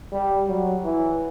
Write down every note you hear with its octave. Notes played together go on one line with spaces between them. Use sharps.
G3
F#3
E3